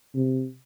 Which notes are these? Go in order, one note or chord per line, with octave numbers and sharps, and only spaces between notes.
C3